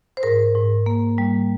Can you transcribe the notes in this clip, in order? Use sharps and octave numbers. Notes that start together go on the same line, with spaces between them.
C5
G#2 A#4
G#2
A#3
G3